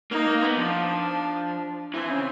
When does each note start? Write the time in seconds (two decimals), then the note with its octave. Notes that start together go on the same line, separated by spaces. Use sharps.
0.11 A#3 D#4
0.27 A#3
0.42 B3
0.57 F3 D4
1.94 E3 C4
2.10 C#3